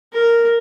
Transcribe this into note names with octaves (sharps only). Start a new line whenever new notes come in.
A#4